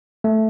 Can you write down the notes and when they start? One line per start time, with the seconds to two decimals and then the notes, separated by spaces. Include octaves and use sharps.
0.24 A3